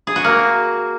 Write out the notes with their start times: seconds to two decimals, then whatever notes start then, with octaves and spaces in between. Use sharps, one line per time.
0.07 G#4
0.16 F#4
0.24 A#3